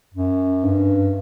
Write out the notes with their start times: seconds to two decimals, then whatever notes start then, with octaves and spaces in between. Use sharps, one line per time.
0.14 F#2
0.64 G2